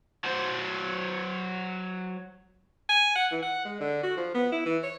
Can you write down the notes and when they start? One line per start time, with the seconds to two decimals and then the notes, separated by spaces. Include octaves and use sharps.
0.24 F#3 C5
2.89 G#5
3.16 F#5
3.31 E3
3.42 F#5
3.65 G#3
3.80 D3
4.03 F#4
4.17 F3
4.34 B3
4.52 E4
4.66 E3
4.83 C#5